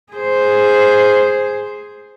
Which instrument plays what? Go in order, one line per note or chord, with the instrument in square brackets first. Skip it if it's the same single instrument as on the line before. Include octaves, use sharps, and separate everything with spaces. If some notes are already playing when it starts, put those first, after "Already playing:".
[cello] G#4 C5